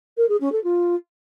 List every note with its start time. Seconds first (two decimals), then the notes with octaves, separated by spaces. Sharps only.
0.17 A#4
0.29 G#4
0.40 C#4
0.52 A4
0.63 F4